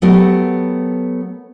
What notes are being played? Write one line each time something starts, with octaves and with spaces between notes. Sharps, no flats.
F#3 A3 B3 G4 A#4 F#5